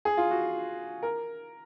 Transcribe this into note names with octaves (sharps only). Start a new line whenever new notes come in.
G#4
F4
F#4
A#4